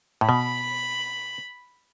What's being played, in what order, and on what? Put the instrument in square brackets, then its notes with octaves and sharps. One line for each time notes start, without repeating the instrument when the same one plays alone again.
[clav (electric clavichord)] A2
[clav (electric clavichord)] B2 [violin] B5